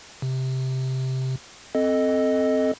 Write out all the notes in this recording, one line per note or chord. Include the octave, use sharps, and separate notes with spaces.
C3
C4 A4 D#5